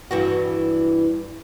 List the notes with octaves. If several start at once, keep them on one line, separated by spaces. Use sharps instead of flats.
G2 E3 F#4